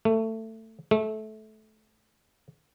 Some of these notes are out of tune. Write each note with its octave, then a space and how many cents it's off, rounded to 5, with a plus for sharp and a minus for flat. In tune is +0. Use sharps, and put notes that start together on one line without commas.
A3 +20
A3 -20